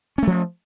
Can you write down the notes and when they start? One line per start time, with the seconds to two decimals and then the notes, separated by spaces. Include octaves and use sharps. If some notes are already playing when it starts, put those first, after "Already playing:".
0.18 C#4
0.23 A3
0.27 F3